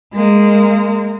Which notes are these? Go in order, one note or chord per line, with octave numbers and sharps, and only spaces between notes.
G#3 A#3